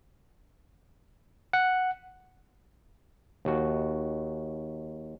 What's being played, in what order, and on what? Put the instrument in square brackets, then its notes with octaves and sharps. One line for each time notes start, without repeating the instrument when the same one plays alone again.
[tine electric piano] F#5
[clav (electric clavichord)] D#2 F#4